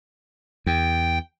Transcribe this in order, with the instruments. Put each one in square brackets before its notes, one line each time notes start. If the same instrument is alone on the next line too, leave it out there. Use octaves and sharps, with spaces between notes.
[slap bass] E2 [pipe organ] G5